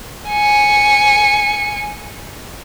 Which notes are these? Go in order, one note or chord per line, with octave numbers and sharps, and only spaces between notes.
G#5 C#7